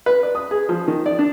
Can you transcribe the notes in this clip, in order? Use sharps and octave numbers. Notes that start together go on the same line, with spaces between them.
B4
D5
D#6
G#4
F3
D#3
D5
D4